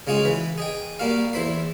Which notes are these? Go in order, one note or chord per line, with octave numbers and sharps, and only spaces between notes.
C#3 G#3 F4 F#4 G#4
E3 B4
G#4 D#5 G5
G3 A#3 F#4 F5
E2 E4 C5 B5 C6